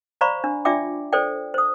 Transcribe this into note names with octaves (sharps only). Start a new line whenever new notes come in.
C5 D5 F5 A#5 B5 C#6
D4
D4 F4 D5 E5 G5 D6
A4 C5 D5 G5
C5 D#6